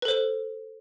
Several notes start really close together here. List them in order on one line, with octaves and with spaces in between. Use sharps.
B4 A4 C5